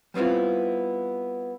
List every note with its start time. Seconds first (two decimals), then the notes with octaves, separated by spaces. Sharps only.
0.14 G3 B3 C4 E4 F4